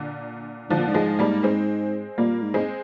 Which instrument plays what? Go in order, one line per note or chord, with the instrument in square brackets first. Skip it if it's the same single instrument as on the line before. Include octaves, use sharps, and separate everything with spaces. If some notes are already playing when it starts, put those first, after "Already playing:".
Already playing: [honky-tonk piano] A#2 D3
[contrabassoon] G#2 [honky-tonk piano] D3 F3
[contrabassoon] A#2
G#2
[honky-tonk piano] F3 G#3
G3 A#3
G#3 C4
[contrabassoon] A#2 [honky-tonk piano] G3 A#3
[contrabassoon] G#2
[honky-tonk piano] G#3 C4